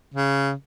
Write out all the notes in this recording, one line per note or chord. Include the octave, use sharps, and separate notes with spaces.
C#3